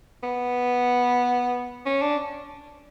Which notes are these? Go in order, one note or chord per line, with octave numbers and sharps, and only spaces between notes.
B3
C#4
D4